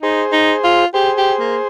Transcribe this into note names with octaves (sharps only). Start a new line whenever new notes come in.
D#4 G#4 C5
D#4
F4
G4 G#4 C5
G4
A#3